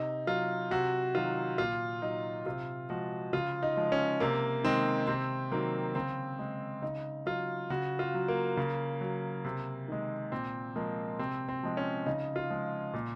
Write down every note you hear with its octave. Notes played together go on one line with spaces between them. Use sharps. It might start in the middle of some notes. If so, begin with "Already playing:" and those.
Already playing: C3 D#4
F#3 F4
C3 F#4
D#3 F#3 F4
A#2 F4
F#3 D#4
C3 F4
F3 G#3 F#4
C#3 F4
D#4
F3 G#3
C#4
C3 A#3
D#3 G#3 C4
C3 C4
D#3 F#3 A#3
C#3 C4
G#3
C#3 D#4
F#3 F4
C#3 F#4
F4
F#3
A#3
C#3
F#3
C3
D#3 G#3
A#2 C4
F3 G#3 A#3
C3 C4
C4
F3 G#3
C#4
C#3 D#4
F4
F3 G#3
A#2